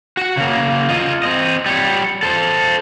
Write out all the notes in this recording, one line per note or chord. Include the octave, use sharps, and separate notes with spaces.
F#4 F#5
C#3 A#3
F4 D#5
C4 D#5
G3 C#5
A4 C5